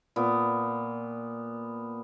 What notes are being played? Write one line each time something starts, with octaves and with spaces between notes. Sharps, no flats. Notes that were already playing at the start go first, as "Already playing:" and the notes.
A#2 B3